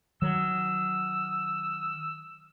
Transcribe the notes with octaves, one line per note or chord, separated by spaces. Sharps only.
D#3 F#3 E6